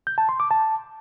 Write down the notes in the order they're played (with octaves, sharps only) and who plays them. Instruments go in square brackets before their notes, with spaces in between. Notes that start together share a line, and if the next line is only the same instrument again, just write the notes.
[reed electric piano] G6
A5
C6
D6
A5